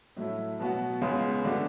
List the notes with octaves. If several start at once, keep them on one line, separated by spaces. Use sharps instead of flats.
A2 F#3 A3 E4
B2 F#3 B3 F#4
C#2 C#3 G#3 B3
D3 A3 D4 F#4